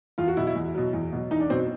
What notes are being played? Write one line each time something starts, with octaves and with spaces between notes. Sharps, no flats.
E2 F4
F#4
B2 F#3 E4
E4
E2
B2 F#3
E2
B2 F#3
E2 D#4
D4
B2 F#3 C4